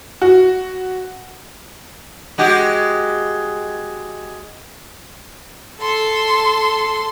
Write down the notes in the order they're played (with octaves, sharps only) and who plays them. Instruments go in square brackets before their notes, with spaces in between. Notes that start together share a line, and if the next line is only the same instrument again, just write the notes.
[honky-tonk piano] F#4
[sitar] G#3 F#4 G4
[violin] A4 C6